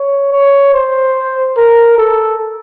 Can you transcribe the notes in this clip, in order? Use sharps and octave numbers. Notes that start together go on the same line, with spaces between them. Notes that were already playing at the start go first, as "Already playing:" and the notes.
Already playing: C#5
C#5
C5
A#4
A4